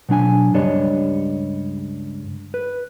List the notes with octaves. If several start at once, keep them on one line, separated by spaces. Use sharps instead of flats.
B2 F#3 D4 G#5
C#2 G2 G3 D4 C#5 D#5
B4